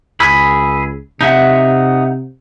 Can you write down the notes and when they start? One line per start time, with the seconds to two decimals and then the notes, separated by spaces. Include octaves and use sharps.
0.20 C#2 G#4 B5 E6
1.21 C3 D#4 E5 F#5